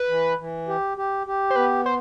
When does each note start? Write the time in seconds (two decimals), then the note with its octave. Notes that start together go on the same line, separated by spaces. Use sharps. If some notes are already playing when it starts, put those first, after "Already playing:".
Already playing: B4
0.09 E3
0.38 E3
0.68 G4
0.97 G4
1.27 G4
1.50 C5
1.56 B3 B4
1.86 C5